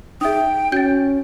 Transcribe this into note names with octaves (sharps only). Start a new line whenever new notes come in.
D#4 G#4 E5 G5 D#6
C#4 F#4 G6 A6